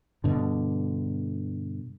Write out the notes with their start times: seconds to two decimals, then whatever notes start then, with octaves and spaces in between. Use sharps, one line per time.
0.24 G2 B2 D3